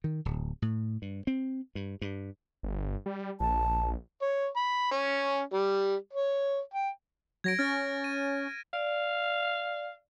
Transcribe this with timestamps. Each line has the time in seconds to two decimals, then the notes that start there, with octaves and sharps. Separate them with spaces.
0.04 D#3
0.25 D1
0.62 A2
1.02 G2
1.27 C4
1.75 G2
2.02 G2
2.63 G1
3.06 G3
3.40 A#1 A5
4.22 C#5
4.56 B5
4.92 C#4
5.54 G3
6.13 C#5
6.74 G5
7.44 F#3 G#6 A#6 D7
7.59 C#4 F6 A6
8.04 D#7
8.73 D5 F5